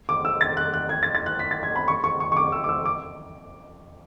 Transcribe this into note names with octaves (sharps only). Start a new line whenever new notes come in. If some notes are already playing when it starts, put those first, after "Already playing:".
D6
E6
A6
F#6
F#6
G#6
A6
A6
F#6
B6
A6
G#6
B5
C#6
C#6
C#6
C#6
D6
E6
D6
E6
D6